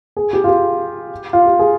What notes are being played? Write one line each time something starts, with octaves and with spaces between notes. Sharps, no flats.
G#4
G4
F4
G4
F4
G4
G#4